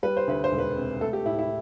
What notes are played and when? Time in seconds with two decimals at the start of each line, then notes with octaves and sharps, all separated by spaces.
0.03 G3 B4
0.17 C5
0.27 D2 B4
0.44 C5
0.51 E1
0.58 B4
0.76 C3
1.01 A3 A4
1.13 G4
1.26 A2 E4
1.39 E4